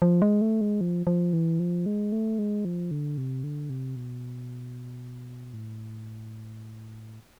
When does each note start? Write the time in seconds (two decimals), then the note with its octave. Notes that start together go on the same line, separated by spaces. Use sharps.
0.02 F3
0.22 G#3
0.41 A3
0.61 G#3
0.81 F3
1.07 F3
1.33 E3
1.60 F3
1.86 G#3
2.12 A3
2.39 G#3
2.65 F3
2.91 D3
3.18 C3
3.44 D3
3.70 C3
3.96 B2
5.54 A2